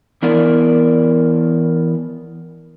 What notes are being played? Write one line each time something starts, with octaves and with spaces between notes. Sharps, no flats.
E3 B3 E4 A#4 D5